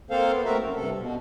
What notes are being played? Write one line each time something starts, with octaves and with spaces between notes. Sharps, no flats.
A#3 C4 A4 C5 F5
B3
A2 C4 F#4 A#4 E5
F#2
G2 C3 A4
B2